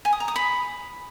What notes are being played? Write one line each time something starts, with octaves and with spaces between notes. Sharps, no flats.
G#5
D#6
A#5
D#6
B5